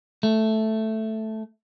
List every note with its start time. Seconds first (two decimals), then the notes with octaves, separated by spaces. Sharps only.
0.23 A3